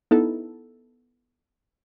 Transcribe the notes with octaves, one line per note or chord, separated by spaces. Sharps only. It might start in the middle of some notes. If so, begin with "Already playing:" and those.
B3 D#4 E4 A4